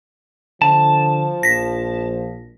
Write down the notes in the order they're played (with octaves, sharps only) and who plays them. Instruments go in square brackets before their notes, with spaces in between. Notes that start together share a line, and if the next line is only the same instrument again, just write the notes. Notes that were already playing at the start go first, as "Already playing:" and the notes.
[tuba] D3 [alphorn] F3 [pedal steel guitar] A5
[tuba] A#1 [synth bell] A#6 B6